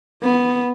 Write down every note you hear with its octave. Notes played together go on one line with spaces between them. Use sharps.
B3